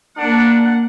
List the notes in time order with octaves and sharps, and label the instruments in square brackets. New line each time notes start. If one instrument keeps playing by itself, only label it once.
[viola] A#3 F#5 [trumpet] D4